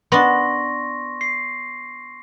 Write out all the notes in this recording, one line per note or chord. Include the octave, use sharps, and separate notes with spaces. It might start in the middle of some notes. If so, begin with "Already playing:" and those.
B3 D4 C6 C#6 A#6
C7